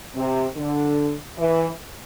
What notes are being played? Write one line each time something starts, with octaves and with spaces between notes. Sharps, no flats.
C3
D3
E3